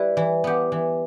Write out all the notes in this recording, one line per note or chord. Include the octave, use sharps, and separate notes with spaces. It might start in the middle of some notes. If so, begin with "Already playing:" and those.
Already playing: G3 E4 B4
E3
B3 G4
E3